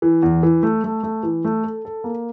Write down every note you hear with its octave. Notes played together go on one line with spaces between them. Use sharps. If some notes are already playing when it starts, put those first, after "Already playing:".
E3
E2
E3
A3
A3
A3
E3
A3
A4
A4
A#3